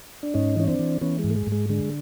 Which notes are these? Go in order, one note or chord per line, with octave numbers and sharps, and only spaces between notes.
D4
G#2 C#4 D#4
E3 C#4
C4 D4
E3
E3 B3 C#4
G#3
G#2
A3
G#3
G#2
G#3
D3 G#3